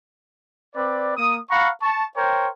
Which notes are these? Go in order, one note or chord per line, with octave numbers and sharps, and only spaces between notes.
C4 B4 D5
A#3 D#6
F5 F#5 A#5 B5 C#6
A5 C#6
A#4 C5 C#5 G5